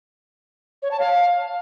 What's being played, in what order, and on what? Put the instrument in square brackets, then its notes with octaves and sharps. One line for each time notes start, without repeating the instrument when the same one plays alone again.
[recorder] C#5
A5
F5